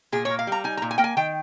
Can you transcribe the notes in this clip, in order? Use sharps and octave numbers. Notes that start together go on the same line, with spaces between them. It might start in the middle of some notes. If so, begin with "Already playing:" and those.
A#2 G#4
C#5
A#3
F5
G3 A#5
D#4 G#5
A#5
A#2
G#5
A#3 G5
G#5
D#3 G5